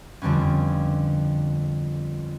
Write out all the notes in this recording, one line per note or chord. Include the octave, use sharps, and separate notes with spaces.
F2 D3 G3 B3 C#4